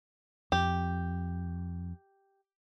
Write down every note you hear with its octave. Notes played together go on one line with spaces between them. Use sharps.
F2 G4